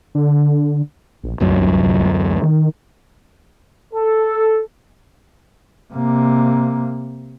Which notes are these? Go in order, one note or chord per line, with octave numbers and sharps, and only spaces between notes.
D3
A#1
D1 C2 F#2 F#3
D#3
A4
C3 A#3